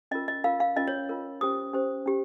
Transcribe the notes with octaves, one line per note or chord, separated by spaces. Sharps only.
C#4 F4 A#4 D#5
D#5
C#4 F4 A#4 F5
F5
C#4 F4 A#4 D#5
C#5
C#4 F4 A#4
C#4 G4 C5 D#6
C#4 G4 C5
C#4 G4